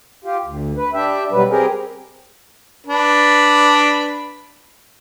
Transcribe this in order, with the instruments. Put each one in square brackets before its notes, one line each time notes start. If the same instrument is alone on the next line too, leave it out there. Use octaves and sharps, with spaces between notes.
[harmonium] F4 G4
D2
B4
D4 G4 E5
B2 F#3 G3 B4
C4 G4 G#4 A#4
[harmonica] D4 B4